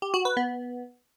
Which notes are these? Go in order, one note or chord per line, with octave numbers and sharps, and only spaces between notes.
G4
F#4
B4
B3